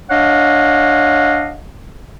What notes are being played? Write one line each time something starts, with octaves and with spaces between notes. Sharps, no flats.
D4 C#5 D#5 F5 F#5